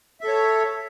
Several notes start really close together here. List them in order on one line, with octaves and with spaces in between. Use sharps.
E5 A4 C#5